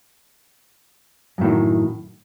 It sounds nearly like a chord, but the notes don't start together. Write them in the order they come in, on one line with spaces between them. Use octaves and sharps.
F#2 A2 D#3